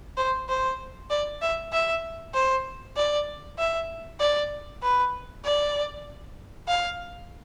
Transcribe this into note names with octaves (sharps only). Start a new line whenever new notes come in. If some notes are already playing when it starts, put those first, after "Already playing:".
C5
C5
D5
E5
E5
C5
D5
E5
D5
B4
D5
F5